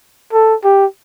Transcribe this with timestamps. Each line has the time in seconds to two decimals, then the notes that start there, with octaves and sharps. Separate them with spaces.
0.33 A4
0.64 G4